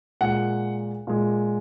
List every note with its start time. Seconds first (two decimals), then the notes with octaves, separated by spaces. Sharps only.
0.21 A#2 G#3 F#5
1.07 A#2 G#3